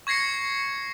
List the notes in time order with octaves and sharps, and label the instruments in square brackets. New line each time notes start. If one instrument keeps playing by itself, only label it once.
[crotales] C#6 G#6 A#6 C7 C#7